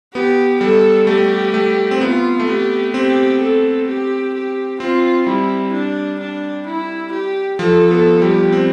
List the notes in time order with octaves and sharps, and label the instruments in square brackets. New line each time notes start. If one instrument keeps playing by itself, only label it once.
[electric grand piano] B3 [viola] G4
[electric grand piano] G3 [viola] A4
[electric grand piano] A3 [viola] G4
[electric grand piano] A3
C4
[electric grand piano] B3 [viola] F4
[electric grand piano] A3
[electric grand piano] B3 [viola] G4
[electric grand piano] C4 [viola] G4
[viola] A4
G4
G4
[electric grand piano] C4 [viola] F4
[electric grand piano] G3 [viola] E4
[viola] D4
D4
E4
G4
[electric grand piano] F3 [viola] A4
[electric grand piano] B3 [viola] A4
[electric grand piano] G3 [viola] G4
[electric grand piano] C4